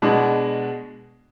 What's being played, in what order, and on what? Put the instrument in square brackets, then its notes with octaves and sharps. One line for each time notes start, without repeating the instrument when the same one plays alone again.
[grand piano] B2 G#3 D4 F#4